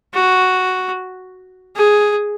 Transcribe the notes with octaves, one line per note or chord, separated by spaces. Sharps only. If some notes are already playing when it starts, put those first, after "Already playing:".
F#4
G#4